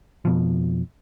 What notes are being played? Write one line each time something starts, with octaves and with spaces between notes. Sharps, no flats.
F2 B2 F3